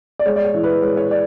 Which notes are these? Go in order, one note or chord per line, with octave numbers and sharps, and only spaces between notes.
D5
G#3 C#5
D5
C#5
E3
B4
G#3 C#5
C#5
D5